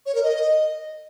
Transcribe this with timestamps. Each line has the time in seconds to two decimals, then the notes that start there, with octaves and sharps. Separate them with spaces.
0.06 C#5
0.15 A#4
0.23 D#5